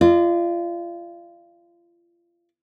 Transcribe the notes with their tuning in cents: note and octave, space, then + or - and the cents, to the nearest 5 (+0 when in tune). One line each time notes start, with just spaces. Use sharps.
F4 -30 D5 +40